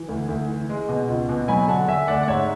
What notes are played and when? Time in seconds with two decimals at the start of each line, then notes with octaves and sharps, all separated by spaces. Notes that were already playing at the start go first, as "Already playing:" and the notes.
Already playing: E3
0.09 D2
0.28 D2
0.48 E3
0.69 G#3
0.89 B2
1.09 C#2
1.29 B2
1.48 F#3 G#5 B5
1.67 D3 F#5 A5
1.87 D3 E5 G#5
2.08 D2 D5 F#5
2.23 F#5
2.27 G#2 C#5 E5